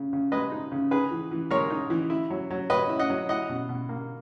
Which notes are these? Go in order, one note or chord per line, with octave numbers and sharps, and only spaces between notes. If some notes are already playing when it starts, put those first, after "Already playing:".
Already playing: C#3
C#3
G#3 B4 D#5
D#4
C#3
D#4 G#4 B4
E3
E3
G#3 A#4 C#5
D#4
E3
E4
F#3
F#3
C#4 B4 D#5
E4
D#5 F#5
F#3
E4 D#5 F#5
B2
B2
A#3